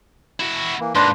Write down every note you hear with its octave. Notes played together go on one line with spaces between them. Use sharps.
E4 F#4
E3 A#3
G#2 A#3 D4 B4 C5 A5